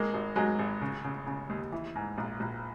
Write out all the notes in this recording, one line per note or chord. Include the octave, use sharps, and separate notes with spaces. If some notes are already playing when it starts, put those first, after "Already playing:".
Already playing: G#1 G#3 A#3
G#1
G#2 F#3 G#3
G#1
C#3
C#3
C#3
D#2
E3
G#2
A#1
A#1